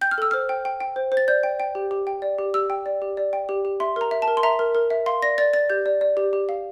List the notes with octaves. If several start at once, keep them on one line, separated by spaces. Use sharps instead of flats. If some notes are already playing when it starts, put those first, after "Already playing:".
G5 G6
F6
A4 E6
C5 F6
G5
G5
G5
C5
C5
A6
D5 G6
G5
G5
G4
G4
G5
D5
G4
G4 E6
G5
D5
G4
D5
G5
G4
G4
E5 C6
A#4 A#5
E5
A5
A#4
C6
E5 A#5
A#4
A#4
E5
F5 C6
D5 A#6
D5 A6
D5 A6
G4 G6
D5
D5
G4
G4
F5